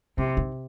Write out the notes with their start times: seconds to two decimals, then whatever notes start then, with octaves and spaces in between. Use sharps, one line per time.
0.18 C3 E4
0.37 D#4